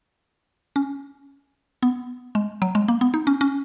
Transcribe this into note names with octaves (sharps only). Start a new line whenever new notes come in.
C#4
B3
G#3
F#3
G#3
A#3
B3
D#4
C#4
C#4